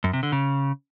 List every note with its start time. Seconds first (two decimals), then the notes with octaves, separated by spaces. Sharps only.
0.04 F#2
0.13 C3
0.23 D3
0.32 C#3